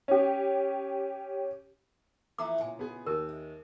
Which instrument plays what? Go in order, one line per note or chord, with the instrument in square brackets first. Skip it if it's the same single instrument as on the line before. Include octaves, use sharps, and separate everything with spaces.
[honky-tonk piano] C#4 G4
[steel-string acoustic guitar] F2 E3 A3 [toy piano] A#5 D6
[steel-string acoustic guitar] A#2 C#3 [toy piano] G#5
[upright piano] B3 G#4
[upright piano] D#2 [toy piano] A#4
[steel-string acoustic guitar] G#3